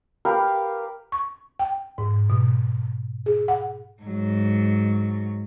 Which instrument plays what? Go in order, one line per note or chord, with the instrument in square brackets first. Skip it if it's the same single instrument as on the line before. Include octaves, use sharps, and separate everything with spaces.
[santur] G4 A#4 B4 F5
[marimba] C#6
G5
G#2
B2
G#4
F#5
[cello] G#2 F#3